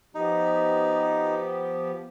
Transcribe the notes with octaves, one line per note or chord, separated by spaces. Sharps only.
F3 B3 D#4 G4